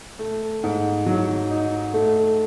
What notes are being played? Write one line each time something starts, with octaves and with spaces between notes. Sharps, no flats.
A3
G#2
F#3
D#4
A3